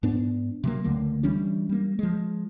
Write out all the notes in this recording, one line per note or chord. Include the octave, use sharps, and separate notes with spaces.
G#2 B3 D4
C3 F#3 A#3
C#2 D3 A3 A#3
E3 G3 C#4 D4
G3 A#3
F3 G#3